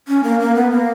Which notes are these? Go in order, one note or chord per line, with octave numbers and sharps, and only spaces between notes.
C#4
A#3
A#3
B3
A#3